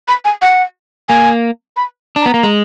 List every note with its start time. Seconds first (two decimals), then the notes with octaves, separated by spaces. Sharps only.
0.08 B5
0.25 G#5
0.42 F#5
1.09 A#3 G#5
1.77 B5
2.16 D4
2.21 B3 A#5
2.34 A#3
2.43 G#3